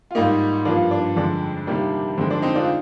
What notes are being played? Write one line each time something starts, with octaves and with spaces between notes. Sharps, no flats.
F4
G#2 G3 A#3 D#4 G4
G2 F3 A#3 D4 F4
D4
F2 D3 G#3 D4
C3 D#3 G3 A#3
F2 D3 G#3 C4
D4
C4 D#4
D4 F4